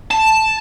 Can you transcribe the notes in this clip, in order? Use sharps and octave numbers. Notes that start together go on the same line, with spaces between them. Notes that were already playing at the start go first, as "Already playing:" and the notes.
A5